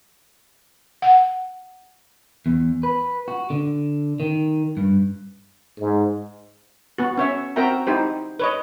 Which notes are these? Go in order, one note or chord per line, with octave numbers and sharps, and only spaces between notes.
F#5
E2
B4
F#4
D3
D#3
G2
G#2
B3 F#4
C#4 C#5 E5
C4 F#4 A#4 E5 G5 A#5
D#4 E4 G4 C5
B4 C#5 D#5